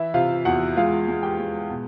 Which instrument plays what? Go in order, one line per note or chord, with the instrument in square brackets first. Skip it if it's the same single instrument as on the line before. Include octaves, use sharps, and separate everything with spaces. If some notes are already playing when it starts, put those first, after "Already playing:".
Already playing: [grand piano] E3 E4 E5
C3 F4 F5
E2 F#4 F#5
G#3 F4 F5
G#3
G4 G5
G#3
B2